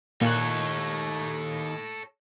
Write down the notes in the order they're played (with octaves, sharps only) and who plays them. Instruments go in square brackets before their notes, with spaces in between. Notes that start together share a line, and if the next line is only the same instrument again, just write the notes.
[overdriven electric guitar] D#2 [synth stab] A#2 F#6 [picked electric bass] A#3 [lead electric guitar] A4 C#5